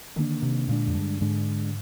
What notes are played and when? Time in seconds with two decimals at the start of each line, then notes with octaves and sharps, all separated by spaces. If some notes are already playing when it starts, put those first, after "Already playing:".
0.16 D3 D#3 A#3 D4
0.43 C3
0.68 A#2 D3 G#3 D4
0.87 F2
0.95 G2
1.21 G#2 D3 G#3 D4